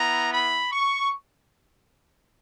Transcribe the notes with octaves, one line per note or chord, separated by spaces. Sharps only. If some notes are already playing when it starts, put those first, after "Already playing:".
Already playing: B3 E4 A#5
B5
C#6